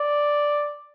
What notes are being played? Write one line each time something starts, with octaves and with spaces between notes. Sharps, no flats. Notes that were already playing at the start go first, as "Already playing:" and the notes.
Already playing: D5